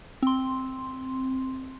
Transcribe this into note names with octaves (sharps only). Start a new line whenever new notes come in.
C4 C6